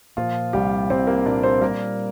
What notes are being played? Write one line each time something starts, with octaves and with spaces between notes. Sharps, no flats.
A#2 F3 F4
C2 G3 G4
C2 C4 C5
A#3 A#4
A#2 D4 D5
C4 C5
G3 A#3 A#4